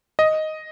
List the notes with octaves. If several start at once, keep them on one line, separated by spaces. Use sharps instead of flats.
D#5